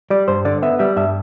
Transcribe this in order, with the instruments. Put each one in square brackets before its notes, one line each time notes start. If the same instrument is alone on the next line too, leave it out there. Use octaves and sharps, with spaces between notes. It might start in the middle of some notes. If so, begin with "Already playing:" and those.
[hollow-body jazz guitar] G3 D5
G2 C5
D3 D5
B3 E5
G3 E5
G2 E5